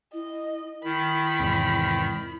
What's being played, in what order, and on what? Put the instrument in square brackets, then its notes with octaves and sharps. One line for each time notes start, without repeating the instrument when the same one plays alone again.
[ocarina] E4 [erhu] D#5
[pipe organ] D#3 [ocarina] E4 [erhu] B5
[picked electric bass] E2 G#2 C3